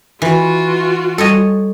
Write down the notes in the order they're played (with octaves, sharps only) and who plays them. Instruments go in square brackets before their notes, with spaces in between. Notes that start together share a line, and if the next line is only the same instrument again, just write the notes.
[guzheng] E3 [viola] F4 F#4
[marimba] G3 [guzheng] A4 C#5 D#5